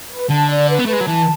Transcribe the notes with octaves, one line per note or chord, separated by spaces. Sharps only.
B4
D3 A5
D5
B4
B3
A3 B4
G#3
F#3
E3 A5